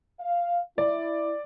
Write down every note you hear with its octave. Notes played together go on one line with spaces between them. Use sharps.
F5
E4 D5